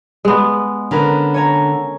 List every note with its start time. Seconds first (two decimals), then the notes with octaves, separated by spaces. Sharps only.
0.25 G#3 B3
0.91 D3 C#4 A#4 B4
1.34 C#5 G#5 A#5